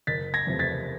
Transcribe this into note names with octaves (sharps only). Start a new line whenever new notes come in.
F#1 A6 B6
G#6 A#6
E2 C3 F3 A3
A6 B6